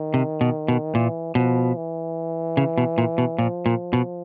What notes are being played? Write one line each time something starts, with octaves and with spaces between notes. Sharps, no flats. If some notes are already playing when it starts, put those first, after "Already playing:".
Already playing: D#3
C3
B2
B2
A#2 E3
B2 F3
E3
C#3
B2
A#2
B2
A#2 F3
A#2
B2